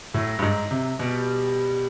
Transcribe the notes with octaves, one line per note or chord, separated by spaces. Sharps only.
A2 F#3
G2
G#2
C3
B2 G3